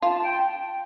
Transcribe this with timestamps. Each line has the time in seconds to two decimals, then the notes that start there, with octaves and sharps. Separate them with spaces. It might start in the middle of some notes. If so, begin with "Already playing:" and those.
0.02 F4 A5
0.22 G5